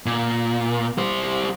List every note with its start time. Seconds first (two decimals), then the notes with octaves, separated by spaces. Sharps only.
0.06 A#2
0.98 G3 C5